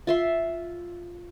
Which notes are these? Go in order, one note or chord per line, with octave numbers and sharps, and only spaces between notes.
F4 E5 C6